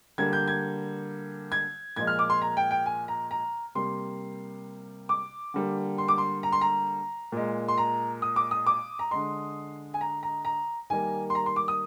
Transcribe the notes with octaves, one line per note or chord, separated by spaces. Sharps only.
D3 G3 A#3 G#6
G6
G#6
G#6
A#2 F3 G#3 G#6
F6
D6
C6
A#5
G5
G5
G#5
A#5
A#5
C3 G3 A#3 C6
D6
D3 G3 A#3
C6
D6
C6
A#5
C6
A#5
A#2 G#3
C6
A#5
D#6
D6
D#6
D6
A#5
D3 G#3 C6
G#5
A#5
A#5
A#5
D#3 G3 A#3 G#5
C6
A#5
C6
D6
D#6